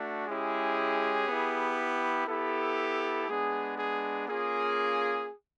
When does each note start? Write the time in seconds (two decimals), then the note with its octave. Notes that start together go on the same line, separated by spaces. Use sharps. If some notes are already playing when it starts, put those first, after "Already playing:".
Already playing: A3 D4 F#4
0.27 G#3 C#4 E4 G4 G#4
1.27 B3 E4 G4
2.27 B3 E4 G4 A4
3.28 G#3 B3 D4 G#4
3.78 G#4
4.28 A#3 C#4 F4 G#4